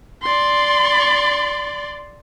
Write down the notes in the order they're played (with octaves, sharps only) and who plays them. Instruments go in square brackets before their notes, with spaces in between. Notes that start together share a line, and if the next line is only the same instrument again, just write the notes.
[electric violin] D5 C6